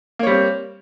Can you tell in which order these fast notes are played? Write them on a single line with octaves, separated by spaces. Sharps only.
A#3 C#5 G3 C4